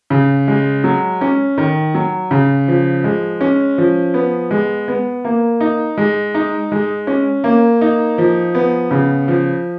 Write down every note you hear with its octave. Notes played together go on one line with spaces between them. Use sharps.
C#3
G#3
F#3
C#4
D#3
F#3
C#3
F3
G#3
C#4
F3
B3
G#3
B3
A#3
D#4
G#3
D#4
G#3
C#4
A#3
D#4
F3
B3
C#3
F3